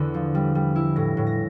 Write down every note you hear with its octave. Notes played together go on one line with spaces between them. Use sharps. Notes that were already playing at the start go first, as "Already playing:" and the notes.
Already playing: E2 D3 A3
F3
G3
G3
E4
A2 A#6
A2
A#6